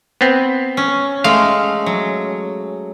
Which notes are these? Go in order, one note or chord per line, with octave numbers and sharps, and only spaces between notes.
B3 C4
C#4
G#3 A3 F5
F#3